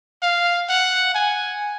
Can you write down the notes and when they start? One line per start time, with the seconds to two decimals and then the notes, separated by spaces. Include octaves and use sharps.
0.22 F5
0.69 F#5
1.14 G#5